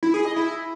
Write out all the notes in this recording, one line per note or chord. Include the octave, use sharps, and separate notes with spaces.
E4
G#4
D#5
E4